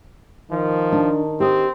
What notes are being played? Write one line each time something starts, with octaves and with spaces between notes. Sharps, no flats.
D#3 F3
D4
C4 G4 D#5